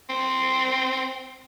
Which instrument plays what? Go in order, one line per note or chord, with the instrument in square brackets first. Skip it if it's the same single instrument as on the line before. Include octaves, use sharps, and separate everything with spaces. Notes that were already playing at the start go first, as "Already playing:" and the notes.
[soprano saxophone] C4